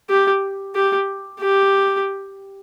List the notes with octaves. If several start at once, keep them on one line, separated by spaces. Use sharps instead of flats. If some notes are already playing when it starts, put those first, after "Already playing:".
G4
G4
G4